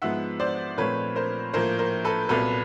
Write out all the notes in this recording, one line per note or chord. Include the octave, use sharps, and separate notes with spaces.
G#2 F3 G#3 B3 E5 F#5
C5 D5
A#2 F3 A3 C4 B4 C#5
A#4 C5
A2 F3 A#3 A#4 C5
A#4 C5
A4 B4
C2 A#2 F#3 B3 A4 B4